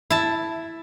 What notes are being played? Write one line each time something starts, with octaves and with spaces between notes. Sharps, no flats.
E4 A5